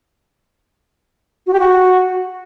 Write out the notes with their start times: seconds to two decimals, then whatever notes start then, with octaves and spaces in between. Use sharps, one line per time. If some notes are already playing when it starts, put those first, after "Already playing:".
1.47 F#4
1.53 G4
1.60 F#4